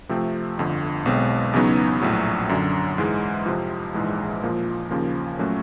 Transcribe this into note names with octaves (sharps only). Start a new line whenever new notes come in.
C3 F3 A3 C4
G1 F2 D3
B1 B2 G#3 C4
E2 C#3 F#3 B3 D#4
A#1 A2 F#3
F#2 D3 F#3
G#2 E3 G#3
F2 C3 F3
A#1 G#2 E3 G#3
A#2 F3 A#3
D#2 C#3 F3 A#3
A#2 F#3 A3 C#4 F#4